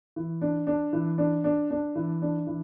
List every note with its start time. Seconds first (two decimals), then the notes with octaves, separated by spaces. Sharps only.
0.16 E3
0.41 D4
0.67 D4
0.93 E3
1.18 D4
1.44 D4
1.71 D4
1.96 E3
2.22 D4
2.47 E3